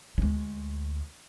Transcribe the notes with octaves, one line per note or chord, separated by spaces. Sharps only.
D2 G#3